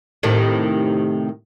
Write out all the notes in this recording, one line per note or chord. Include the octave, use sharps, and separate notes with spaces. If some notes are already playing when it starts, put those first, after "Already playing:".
A2 C3 D#3